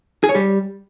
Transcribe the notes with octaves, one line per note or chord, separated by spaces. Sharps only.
G#4
C#5
G3